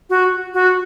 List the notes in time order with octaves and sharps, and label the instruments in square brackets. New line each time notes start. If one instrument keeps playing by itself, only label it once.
[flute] F#4
F#4